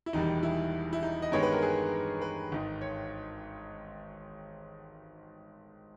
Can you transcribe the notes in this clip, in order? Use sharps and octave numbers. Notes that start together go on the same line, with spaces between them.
E4
E1 E2 D#3 G3 D#4
E4
E4
D#4
D#5
G2 D#3 G#3 B3 C#5
B4
A#4
G#4
B4
G#1 G#2 D#3
C#5